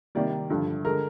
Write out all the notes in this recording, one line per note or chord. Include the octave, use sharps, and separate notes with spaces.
C3 D#3 G3 A#3 D5
G2 D3 F3
D3 G#3 A#4